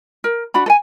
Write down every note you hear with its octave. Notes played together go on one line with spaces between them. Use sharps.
A#4
D4 F#4 B5
A4 G#5